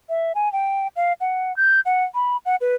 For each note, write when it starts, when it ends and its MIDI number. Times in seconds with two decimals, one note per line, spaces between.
0.09 0.32 76
0.35 0.51 80
0.52 0.87 79
0.96 1.13 77
1.20 1.55 78
1.56 1.80 91
1.85 2.04 78
2.14 2.37 83
2.45 2.56 78
2.61 2.75 71